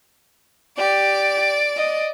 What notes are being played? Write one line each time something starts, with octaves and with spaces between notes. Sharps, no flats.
G4 D5
D#5